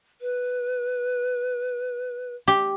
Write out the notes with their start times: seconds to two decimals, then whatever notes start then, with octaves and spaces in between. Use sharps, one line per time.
0.21 B4
2.47 G4